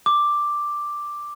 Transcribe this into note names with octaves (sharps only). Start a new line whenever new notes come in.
D6